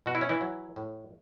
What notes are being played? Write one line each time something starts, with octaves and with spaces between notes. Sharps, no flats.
B2 F#4
E4
C#4
E3 E4
F#3
A2